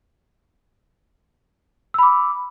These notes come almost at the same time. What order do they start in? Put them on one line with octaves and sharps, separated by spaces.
E6 B5 D6